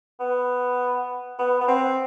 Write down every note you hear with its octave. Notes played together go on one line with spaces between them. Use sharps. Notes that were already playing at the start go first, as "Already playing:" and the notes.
B3
B3
B3
C4